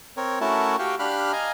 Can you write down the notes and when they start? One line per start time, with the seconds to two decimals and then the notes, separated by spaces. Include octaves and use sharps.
0.17 C4 A#4 C#5
0.41 A3 C#4 E4 F#4 A#4 A5
0.79 F#4 G4 F5 G5
0.99 D4 G4 F5 B5 F6 F#6
1.33 D#5 F5 G#5 A#5